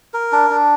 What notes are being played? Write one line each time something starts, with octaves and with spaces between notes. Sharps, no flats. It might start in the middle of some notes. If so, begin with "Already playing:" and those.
A#4
D4
D4